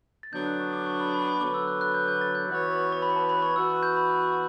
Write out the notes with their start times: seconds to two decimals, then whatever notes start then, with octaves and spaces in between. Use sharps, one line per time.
0.23 A6
0.33 D3 F#3 B3 D4 G6
0.46 F#6
0.60 C#6
0.73 D6
0.86 C#6
1.00 B5
1.14 B5
1.23 A5
1.27 B5
1.40 D3 F#3 B3 D6
1.54 E6
1.68 F#6
1.81 F#6
1.94 G6
2.08 G6
2.21 A6
2.35 G6
2.48 E3 B3 F#4 C#5
2.92 C#6
3.02 B5
3.16 A5
3.30 B5
3.42 C#6
3.56 E3 B3 F#4 E6
3.83 G6
3.97 B5
4.10 B5